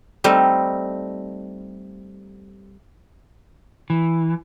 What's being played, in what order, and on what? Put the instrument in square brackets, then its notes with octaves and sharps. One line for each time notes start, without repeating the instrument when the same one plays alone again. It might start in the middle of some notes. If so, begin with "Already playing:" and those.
[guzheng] G3 A3 C4 D#4
[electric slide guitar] E3